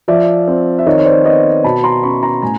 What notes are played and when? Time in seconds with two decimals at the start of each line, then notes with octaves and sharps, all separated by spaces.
0.08 F3 D5 E5
0.48 C4
0.79 E5
0.86 D#3 C#5 D#5
0.99 C#5
1.06 C5 D5
1.25 B3 C#5 D#5
1.64 B2 A5 B5
1.84 A#5 C6
2.03 C#4 B5 C#6
2.23 A#5 C6
2.42 A2 G#5 A#5